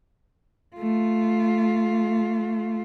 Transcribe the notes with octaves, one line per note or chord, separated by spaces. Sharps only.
A3 F4